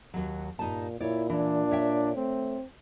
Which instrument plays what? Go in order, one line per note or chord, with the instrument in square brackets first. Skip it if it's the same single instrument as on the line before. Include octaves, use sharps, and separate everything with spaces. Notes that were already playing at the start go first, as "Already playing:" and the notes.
[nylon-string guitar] D#2 F#3
[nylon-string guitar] G2 D#4 A5 [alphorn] A#2
[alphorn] A#2 [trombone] E4 [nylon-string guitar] C#5 D5
[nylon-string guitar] E3 [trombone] D4
[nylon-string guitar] C#5 E5 G5
[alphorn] A3 [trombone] C4